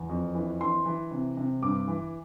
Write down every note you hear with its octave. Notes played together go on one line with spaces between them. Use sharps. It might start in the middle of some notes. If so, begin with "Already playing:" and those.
Already playing: E2
F2
E3
E3 C6
E3
C3
C3
G2 D6
E3